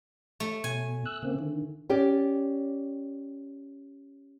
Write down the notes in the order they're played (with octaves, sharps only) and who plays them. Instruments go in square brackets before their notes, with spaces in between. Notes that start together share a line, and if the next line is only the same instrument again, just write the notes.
[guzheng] A3
[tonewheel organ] B2 [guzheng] G#5
[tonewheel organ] E6 F#6
C#3 A#3 C4
D3 D#3
[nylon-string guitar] C#4 G4 D5